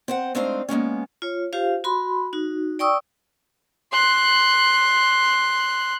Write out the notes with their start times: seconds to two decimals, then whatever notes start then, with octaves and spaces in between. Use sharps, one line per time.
0.08 C4 C5 F#5
0.35 G#3 A3 C4 D4 D#4 F5
0.69 G#3 A#3 B3 C#4
1.22 F4 C#5
1.53 F4 G4 C5 F5
1.84 F#4 B5 C6
2.33 D#4 F#4
2.79 D5 G5 C#6 D#6 E6
3.92 C6 F#6